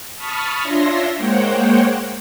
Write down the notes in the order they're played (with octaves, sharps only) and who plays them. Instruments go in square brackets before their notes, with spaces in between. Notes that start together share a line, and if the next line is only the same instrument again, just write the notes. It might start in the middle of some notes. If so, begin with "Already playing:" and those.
[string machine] A5 B5 C#6 D#6 F6
D4 F4 C#5 E5 C6 A#6
G#3 A#3 C5 C#5 F#5 G5